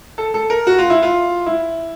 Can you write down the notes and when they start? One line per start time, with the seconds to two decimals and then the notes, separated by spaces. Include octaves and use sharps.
0.18 A4
0.34 A4
0.50 A#4
0.67 F#4
0.78 F4
0.90 E4
1.03 F4
1.46 E4